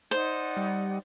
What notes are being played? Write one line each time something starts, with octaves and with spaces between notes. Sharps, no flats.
D#4 C5 D5 F#5
G3